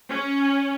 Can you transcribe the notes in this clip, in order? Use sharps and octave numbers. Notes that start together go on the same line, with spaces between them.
C#4